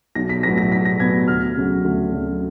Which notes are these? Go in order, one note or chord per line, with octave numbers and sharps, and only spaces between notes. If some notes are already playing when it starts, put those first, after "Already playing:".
B1 A#6
B6
A2 F#3 B3 A#6
A#6
B1 B6
A#6
A2 F#3 B3 G#6
D2 F6
C#3 F#3
D2
C#3 F#3